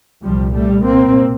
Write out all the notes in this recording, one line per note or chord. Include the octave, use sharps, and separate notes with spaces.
C2 A#2 F3 G3
G3 A3
C2 A#2 A#3 C4